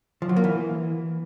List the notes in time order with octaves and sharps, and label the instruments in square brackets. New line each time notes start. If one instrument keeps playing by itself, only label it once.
[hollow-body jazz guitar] F3
F#3
A#3
E3